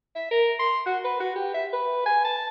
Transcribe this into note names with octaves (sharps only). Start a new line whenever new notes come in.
E5
A#4
C6
F#4
B4
F#4
G4
E5
B4
G#5
A5